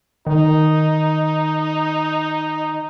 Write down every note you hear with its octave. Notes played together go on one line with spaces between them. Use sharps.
D#3 D#4